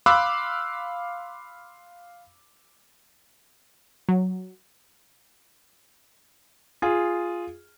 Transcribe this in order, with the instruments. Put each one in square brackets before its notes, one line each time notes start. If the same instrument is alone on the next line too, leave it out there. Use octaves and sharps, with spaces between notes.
[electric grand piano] F5 B5 C6 D6 E6 F#6
[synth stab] F#3
[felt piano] F4 G#4